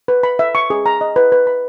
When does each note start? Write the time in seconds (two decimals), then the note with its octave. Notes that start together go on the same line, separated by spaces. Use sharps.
0.08 B4
0.23 B5
0.39 E5
0.55 C#6
0.70 G#4
0.86 A#5
1.01 D#5
1.16 B4
1.32 B4
1.47 B5